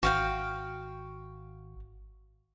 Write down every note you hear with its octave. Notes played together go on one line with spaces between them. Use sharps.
G#1 F#4 F5 G5